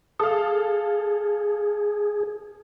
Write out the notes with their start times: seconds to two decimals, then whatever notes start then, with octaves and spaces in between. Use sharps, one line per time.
0.20 G#4 A4 F5